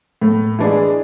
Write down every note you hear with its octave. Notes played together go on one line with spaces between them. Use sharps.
A2
E3 G#3 D4 G#4